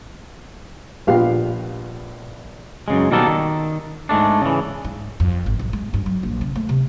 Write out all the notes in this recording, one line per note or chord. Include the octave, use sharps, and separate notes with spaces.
A#1 B3 F4 G4 F5 G5
F#2 C#3 G#3
B2 D#3 G3 A#3 B3 A4
D#3
G#2 G#3 A3 D4
C#3 E3
G#2
F2
G#1
B1
G#3
G2
F#3
A#1
C#3
A3
C3